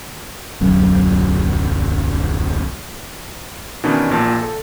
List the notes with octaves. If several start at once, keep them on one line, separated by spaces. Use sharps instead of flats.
D1 B1 F#2
B2 D#3 E3 C#4 D4
A#1 A#2 A5
A4